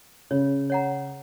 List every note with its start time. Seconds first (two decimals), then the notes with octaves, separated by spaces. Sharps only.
0.31 C#3 C#5
0.70 C#5 F#5 A#5